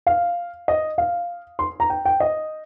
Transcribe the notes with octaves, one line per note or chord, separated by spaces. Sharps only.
F5
D#5
F5
C6
A#5
G5
G5
D#5